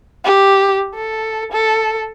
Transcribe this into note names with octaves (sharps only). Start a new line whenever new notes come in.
G4
A4
A4